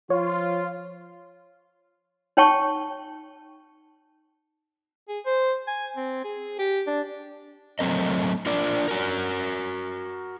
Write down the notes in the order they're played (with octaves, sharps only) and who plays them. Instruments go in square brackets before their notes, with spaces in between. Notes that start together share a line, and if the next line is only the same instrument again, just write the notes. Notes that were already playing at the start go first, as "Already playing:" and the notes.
[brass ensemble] F3 F4 [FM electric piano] C#5
[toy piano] D#4 C#5 G5 A5 C#6
[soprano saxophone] G#4
C5
G#5
C4
G#4
G4
D4
[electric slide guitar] F#3 A3 C4 A#4 D#5
D4 F4 A#4 D5
F#4 A#4